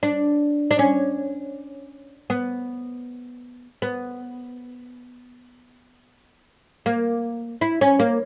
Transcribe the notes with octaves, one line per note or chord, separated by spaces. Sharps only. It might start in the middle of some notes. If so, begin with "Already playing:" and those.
D4
D4
C#4
B3
B3
A#3
E4
C#4
A#3